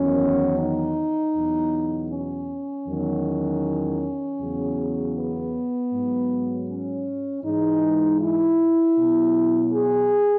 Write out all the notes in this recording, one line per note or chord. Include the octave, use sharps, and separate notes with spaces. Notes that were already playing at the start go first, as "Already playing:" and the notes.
Already playing: E2 D#3 F#3 C#4
D#4
E2 B2 F#3
C#4
E2 D#3 F#3
E2 C#3 F#3
B3
G#2 F#3
C#4
G#2 E3 G#3 D#4
E4
B2 F#3
G#4